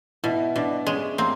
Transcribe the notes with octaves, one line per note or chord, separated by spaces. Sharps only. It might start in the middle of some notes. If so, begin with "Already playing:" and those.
B2 E4
B2 D4
G#3 C#4
A#3 C4